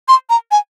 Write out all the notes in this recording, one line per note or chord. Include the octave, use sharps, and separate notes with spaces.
C6
A#5
G#5